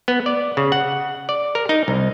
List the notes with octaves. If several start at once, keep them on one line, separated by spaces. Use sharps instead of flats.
B3
D5
C#3
F#5
D5
A#4
D#4
C2